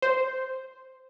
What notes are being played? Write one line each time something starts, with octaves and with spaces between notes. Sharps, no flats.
C5